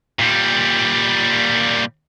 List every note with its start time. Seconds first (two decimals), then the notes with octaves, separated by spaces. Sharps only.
0.19 A#2 G3